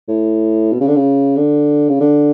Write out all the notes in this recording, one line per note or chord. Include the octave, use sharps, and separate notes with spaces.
A2
B2
C#3
D3
C#3
D3
C#3
D3